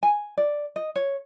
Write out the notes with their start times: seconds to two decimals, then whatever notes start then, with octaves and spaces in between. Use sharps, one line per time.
0.03 G#5
0.38 D5
0.76 D#5
0.96 C#5